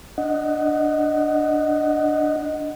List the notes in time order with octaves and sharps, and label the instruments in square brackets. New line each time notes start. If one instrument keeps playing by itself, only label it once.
[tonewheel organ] D4 D#5 F#5